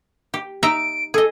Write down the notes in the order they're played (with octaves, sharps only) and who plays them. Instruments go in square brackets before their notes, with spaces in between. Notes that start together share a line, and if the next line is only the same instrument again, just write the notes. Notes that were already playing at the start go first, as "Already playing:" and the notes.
[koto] G4
[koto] D#4 E5 A#5 [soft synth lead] D7
[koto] G#4 D#5 [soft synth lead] A4